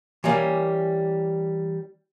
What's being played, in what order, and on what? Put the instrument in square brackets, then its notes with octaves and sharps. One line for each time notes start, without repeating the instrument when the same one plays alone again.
[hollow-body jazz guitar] E3 G3 A#3 C#4